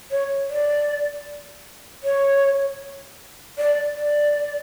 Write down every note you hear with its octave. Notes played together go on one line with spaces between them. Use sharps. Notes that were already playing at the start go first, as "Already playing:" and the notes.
C#5
D5
C#5
D5
D5